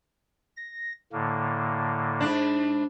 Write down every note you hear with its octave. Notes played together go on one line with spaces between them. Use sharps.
A#6
A2 D3 A#3
G#2 D4